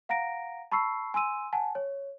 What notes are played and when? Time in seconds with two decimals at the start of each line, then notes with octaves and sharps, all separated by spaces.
0.09 F5 F#5 A#5 A#6 D7
0.72 A5 B5 C#6 E6 C7
1.14 G#5 C6 E6 D#7
1.53 F#5 G#5 A5
1.75 C#5